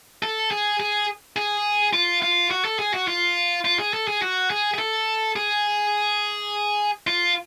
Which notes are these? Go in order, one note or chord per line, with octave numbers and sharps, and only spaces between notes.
A4
G#4
G#4
G#4
F4
F4
F#4
A4
G#4
F#4
F4
F4
G#4
A4
G#4
F#4
G#4
G#4
A4
G#4
F4